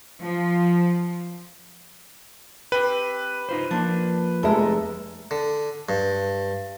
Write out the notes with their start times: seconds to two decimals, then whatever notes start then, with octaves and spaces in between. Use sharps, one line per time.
0.20 F3
2.72 C4 G4 B4
3.49 D#4 F4 C5
3.71 F3 A#3 D4 F4
4.43 F1 G#3 A4 A#4 E5
5.31 D3
5.89 G2